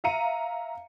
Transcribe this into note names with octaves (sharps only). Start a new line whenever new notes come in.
E5 F5 A#5 C#7 D#7